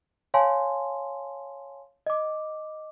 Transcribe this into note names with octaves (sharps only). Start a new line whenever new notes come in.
C#5 F5 G#5 A5 C6
D#5 D6